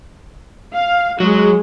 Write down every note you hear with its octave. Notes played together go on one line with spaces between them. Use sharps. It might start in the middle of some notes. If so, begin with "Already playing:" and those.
F5
F#3 G#3